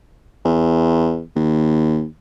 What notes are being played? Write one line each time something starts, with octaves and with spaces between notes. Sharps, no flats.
E2
D#2